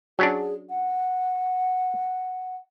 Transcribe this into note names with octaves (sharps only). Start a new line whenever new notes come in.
F#3 C#4 D4 G#4
F#5